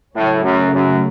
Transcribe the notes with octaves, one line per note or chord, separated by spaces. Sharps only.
A2 C#3 F#3 A3 C#4
F#2
F#2